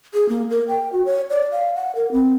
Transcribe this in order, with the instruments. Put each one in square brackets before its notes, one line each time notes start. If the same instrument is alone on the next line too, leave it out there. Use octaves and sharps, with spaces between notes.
[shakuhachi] G#4
A#3
A#4
G5
F#4
C#5
D5
F5
F#5
A#4
C4